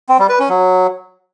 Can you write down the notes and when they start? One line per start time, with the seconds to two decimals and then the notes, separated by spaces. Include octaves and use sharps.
0.09 C4
0.19 G3
0.29 B4
0.39 C#4
0.49 F#3